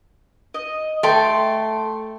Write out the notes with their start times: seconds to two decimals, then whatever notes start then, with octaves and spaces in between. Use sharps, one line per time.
0.54 D#5
1.03 A3 A4 G5 C6